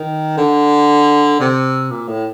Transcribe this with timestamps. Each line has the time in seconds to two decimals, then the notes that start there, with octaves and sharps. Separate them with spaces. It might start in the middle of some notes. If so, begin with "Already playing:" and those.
Already playing: D#3
0.38 D3
1.40 C3
1.91 A#2
2.08 A2